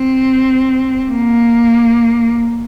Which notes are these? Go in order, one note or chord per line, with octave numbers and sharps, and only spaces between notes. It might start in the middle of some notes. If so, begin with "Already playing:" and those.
Already playing: C4
A#3